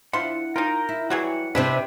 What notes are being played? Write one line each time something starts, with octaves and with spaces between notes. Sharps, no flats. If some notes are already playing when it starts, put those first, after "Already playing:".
F3 D4 E4 F#5 C6
D#4 F4 A#4 G5 A#5
E4
E3 F#3 G3 F#4 G#4
F#5
C3 G#3 C4 D4 B4 C5 E5